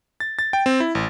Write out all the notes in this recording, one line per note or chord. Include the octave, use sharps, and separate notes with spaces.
A6
A6
G5
C4
E4
A1